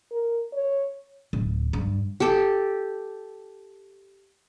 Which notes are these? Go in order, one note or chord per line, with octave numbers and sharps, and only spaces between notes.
A#4
C#5
D1
G2
G4 A4